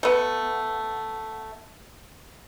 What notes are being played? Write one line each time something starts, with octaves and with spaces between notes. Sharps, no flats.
A3 B3